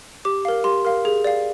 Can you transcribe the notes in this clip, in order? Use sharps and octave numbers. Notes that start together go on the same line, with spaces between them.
G4 D6
A#4 F5
G4 C6
A#4 F5
G#4
D5 F5